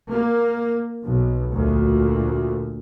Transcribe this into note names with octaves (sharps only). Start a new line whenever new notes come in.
A#3
B1
D2 A#2